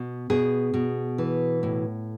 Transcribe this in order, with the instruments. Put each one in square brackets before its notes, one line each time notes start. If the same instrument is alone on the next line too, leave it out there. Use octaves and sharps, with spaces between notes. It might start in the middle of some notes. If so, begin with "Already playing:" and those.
Already playing: [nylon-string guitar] B2
B2 G#4
B2
E3
A2